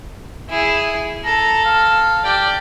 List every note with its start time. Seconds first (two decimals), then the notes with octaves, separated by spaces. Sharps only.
0.49 E4 G#4
1.25 A4 A#5
1.65 F5
2.25 G4 D5